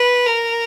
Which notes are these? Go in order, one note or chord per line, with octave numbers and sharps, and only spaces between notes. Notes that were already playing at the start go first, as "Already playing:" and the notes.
Already playing: B4
A#4